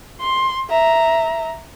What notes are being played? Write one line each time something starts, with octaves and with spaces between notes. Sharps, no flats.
C6
E5 A#5